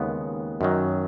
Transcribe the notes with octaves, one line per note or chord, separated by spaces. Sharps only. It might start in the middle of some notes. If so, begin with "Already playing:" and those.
Already playing: D#2 C#3 G#3 B3
F#2 D#3 F#3